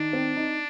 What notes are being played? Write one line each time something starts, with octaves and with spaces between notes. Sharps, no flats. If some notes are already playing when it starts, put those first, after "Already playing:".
Already playing: D#3 D4
C4
D#4